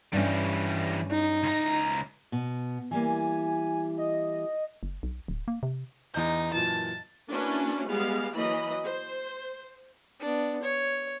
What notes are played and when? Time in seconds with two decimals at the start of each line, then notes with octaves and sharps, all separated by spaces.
0.13 G2 E3 G3 C#4
1.11 D#4
1.43 C#2 A#5
2.32 B2
2.91 E3 G3 A#3 G#5
3.98 D#5
4.83 F#1
5.03 B1
5.28 D1
5.48 A#3
5.63 C3
6.14 E2 D#4 G6
6.53 F#2 A#2 E3 A5
7.31 A#3 C#4 D4 E4 F#4 B4
7.88 G3 G#3 B3 G4 F5
8.36 E3 F#3 A#3 D#5 B5
8.87 C5
10.20 B3 D4
10.63 C#5